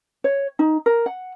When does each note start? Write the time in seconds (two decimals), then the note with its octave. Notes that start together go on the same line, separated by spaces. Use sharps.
0.24 C#5
0.59 D#4
0.86 A#4
1.06 F#5